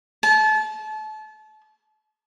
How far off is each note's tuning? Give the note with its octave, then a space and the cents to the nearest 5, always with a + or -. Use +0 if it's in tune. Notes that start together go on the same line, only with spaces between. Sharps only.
A5 -30